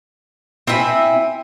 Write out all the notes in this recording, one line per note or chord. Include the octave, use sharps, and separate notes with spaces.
C4 E4 E5 G#5